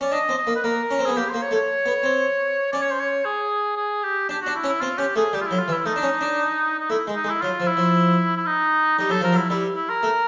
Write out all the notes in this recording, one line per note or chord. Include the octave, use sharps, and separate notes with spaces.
C#4 D5
D4 D#5
C4
D#5
A#3
B4
A#3 A#4
C#4
C4
B3 G#4
A#3 G4
A#3 C5
C#5
A3
C#5
B3
C4
C#4 D5
C#5
C5
C#5
G#4
G#4
G4
D4 G4
D4 F#4
E4
C#4
E4
C4 F4
C#4 G4
A3 G#4
G3 G4
F4
F#3 E4
F4
E3
E4
A3 D#4
D4
C#4
D4
D#4
A3 E4
G#3
D#4
G#3
E4
F#3 F4
F3
E4
F3
E4
D#4
G3 D#4
F#3 A4
F3 A#4
F#3
E4
G3 E4
E4
A#4
A3